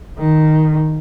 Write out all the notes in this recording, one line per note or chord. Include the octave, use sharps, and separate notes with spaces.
D#3